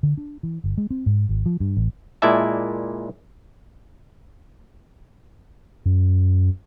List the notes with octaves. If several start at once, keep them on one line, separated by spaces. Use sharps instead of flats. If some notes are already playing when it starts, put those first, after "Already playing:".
D3
D4
E3
G1
G#3
C4
G#2
G#1
F3
G2
A1
A#2 G#3 E4 D5 E5 A5
F#2